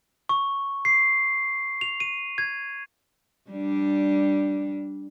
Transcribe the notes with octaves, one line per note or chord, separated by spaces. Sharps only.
C#6
C7
F7
D#7
G#6
G3 D4